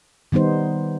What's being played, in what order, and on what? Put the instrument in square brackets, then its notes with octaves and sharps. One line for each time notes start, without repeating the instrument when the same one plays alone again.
[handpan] D#3 G3 B3 D#4 C5